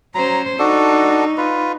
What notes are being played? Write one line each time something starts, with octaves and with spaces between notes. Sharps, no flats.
F#3 C#4 C5 A#5
D4 D#4 F#4 A4
F4 B4